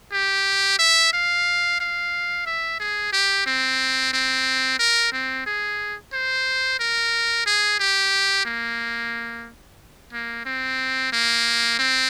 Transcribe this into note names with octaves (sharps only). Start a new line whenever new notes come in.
G4
E5
F5
F5
E5
G#4
G4
C4
C4
A#4
C4
G#4
C5
A#4
G#4
G4
A#3
A#3
C4
A#3
C4